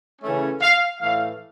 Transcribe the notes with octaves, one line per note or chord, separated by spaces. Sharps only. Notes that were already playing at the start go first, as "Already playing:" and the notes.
C#3 E3 A3 C#4
F5
A2 E3 A3 F5